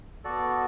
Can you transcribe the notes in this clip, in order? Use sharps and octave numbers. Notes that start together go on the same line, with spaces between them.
B3 F#4 A4 D5